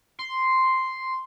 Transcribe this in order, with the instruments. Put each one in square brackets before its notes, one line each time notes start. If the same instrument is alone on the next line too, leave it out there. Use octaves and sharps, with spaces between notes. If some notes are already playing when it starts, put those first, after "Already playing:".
[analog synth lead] C6